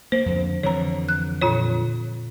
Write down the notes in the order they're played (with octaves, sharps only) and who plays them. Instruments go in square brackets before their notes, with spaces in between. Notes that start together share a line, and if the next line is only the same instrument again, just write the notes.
[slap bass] A#3 [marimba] C5
[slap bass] F2 D3
[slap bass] F2 D3 E3 [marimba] C#5 A#5
[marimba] F#6
A#2 F4 C#5